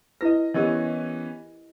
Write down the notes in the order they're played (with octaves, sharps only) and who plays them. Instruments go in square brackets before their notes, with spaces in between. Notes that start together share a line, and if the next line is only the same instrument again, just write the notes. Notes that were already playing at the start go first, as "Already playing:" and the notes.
[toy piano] E4 B4 [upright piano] D#5 A#6
[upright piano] E3 B3 C#4 [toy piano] G4 A#4 D#5